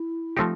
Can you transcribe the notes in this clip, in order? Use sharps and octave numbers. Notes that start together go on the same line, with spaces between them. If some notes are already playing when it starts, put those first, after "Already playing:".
Already playing: E4
F3 A3 C4 D#4 F4 G4